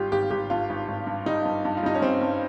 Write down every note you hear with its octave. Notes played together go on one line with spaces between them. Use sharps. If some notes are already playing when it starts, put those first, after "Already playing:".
Already playing: G#1 G3 F4 G4
G#1 G4
G#1 G4
G2 F4
G#1
G#1
G2
G3 D#4
G2
G2
F4
G3 D#4
C#4
G2 C4
G2